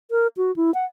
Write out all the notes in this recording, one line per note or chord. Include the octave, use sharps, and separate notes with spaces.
A#4
F#4
E4
F#5